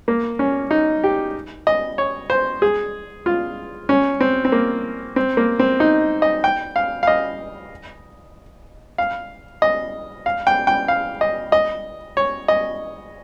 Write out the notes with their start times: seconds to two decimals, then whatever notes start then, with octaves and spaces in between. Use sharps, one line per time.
0.08 A#3
0.39 C#4
0.71 D#4
1.04 G4
1.67 D#5
1.98 C#5
2.30 C5
2.62 G#4
3.26 F4
3.89 C#4
4.21 C4
4.45 C4
4.52 A#3
5.16 C4
5.37 A#3
5.59 C4
5.80 D#4
6.22 D#5
6.44 G5
6.76 F5
7.03 F5
7.07 D#5
8.98 F5
9.62 D#5
10.26 F5
10.47 G5
10.67 G5
10.88 F5
11.21 D#5
11.52 D#5
12.17 C#5
12.48 D#5